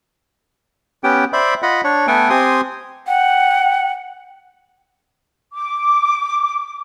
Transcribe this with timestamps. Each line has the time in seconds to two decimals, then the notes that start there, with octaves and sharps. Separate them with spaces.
1.04 B3 C#4 G4 G5
1.33 C5 D5 E5 B5
1.62 F4 D#5 F#5 B5
1.84 D4 C#5
2.07 A3 B3 A4 G5 G#5
2.30 C4 G4 G#5 C6 D#6
3.07 F#5 G5
5.53 D6